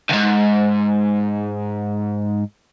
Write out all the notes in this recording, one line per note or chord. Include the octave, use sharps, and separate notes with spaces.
C#2 G#2